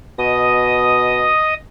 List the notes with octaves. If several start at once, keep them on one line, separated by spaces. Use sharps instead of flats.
B2 D#5 D#6